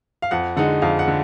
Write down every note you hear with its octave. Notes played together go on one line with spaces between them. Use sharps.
F5
F2 F#5
D3 G#3 D#4 F#5
F2 F5
F#5
D3